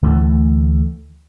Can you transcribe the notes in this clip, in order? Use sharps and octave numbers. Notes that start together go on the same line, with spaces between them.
D2 E3 G#3 A3